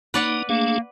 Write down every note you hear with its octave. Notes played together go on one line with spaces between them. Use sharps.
A#3 D#4 B4 D5 F#5
A3 A#3 D4 G#4